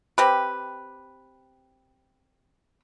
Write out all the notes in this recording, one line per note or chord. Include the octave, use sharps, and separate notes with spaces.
C4 G4 B4